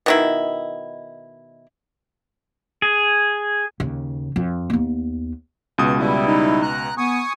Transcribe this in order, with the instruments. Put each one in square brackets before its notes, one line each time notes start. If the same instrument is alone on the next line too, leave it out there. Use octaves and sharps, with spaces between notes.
[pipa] B2 D#3 E4
[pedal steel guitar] G#4
[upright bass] D#2 C#3
F2
D#2 B3
[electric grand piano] C#2 B2 D#6
[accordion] G3 E4
[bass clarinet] D#4
[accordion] A#5 F#6
[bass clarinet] B3 [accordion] G#5 C#6 D#6